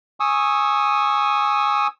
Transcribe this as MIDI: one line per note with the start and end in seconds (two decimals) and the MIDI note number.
0.20 1.87 80
0.20 1.87 85
0.20 1.87 87
0.20 1.87 88